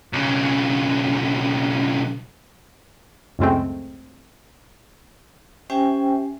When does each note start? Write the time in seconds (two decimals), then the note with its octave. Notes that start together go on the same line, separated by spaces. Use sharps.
0.13 B1 C#3
3.39 C#2 F#2 A2 G#3 A3 C4
5.70 C#4 G4 C5 E5 G5 G#5